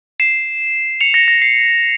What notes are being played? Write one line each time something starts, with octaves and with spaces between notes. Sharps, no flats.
C7 E7
C#7 F7
A#6 C#7
A#6
C7